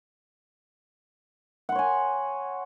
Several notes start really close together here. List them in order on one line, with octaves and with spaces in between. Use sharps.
F#5 C6 C#5 G#5